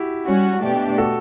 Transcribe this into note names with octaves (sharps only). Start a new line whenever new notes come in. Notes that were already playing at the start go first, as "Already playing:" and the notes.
Already playing: E4 F#4 G4
G3 C#4 F#4
B2 A3 D4 G4
F#4 A4